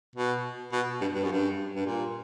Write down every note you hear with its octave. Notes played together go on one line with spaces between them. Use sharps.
B2
B2
G2
G2
F#2
G2
G2
A#2